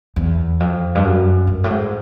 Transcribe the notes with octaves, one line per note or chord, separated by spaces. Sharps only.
E2
F2
G2
F#2
G2
A2
G#2